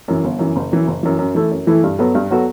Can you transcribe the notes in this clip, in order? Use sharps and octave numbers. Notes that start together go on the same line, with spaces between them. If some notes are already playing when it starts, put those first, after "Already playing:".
F#2 E3
G1
F#2 E3
F#1
F#2 E3
F#1
F#2 E3
F#2
E3 A3 E4 A4
F#2
E3 A3 E4 A4
G2
F#3 B3 F#4 A4
G2
F#3 B3 F#4 A4